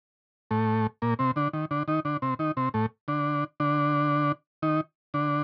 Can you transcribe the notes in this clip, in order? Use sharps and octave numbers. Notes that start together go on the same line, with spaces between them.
A2 A3
A#2 A#3
C3 C4
D3 D4
D#3
D3 D4
D#3 D#4
D3 D4
C3 C4
D#3 D#4
C3 C4
A2 A3
D3 D4
D3 D4
D#3 D#4
D3 D4